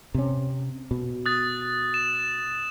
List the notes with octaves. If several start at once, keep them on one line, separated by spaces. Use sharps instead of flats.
C3 C#4
B2
D#6 F#6 A6
E7